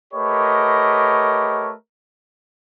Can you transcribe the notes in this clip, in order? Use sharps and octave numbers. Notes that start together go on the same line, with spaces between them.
A3 G4 A#4 B4 C#5 D#5